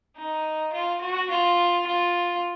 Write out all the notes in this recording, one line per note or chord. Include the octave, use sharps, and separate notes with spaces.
D#4
F4
F#4
F4
F4